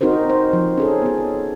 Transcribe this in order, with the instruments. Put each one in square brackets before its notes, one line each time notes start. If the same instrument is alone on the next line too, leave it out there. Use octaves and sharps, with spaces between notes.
[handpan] C4 D#4 F#4 A#4 C5
C5
F3
C#4 G#4 A4
B3 G#4